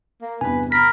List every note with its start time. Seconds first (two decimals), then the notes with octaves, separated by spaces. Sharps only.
0.22 A#3
0.41 E2 G2 C3 B4 G#5
0.72 A#4 B5 B6